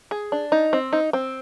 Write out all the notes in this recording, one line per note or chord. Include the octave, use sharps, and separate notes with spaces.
G#4
D4
D#4
C4
D#4
C4